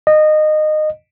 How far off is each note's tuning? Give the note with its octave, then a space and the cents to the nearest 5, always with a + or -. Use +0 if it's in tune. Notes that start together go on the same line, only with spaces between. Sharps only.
D#5 -20